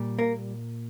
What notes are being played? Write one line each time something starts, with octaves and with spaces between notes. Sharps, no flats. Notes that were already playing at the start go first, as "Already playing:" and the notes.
Already playing: A#2 G3
A#3 A#4